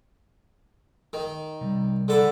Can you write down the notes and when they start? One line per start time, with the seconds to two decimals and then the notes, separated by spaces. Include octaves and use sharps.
1.13 D#3
1.61 C3 G3
2.08 D3 A4 B5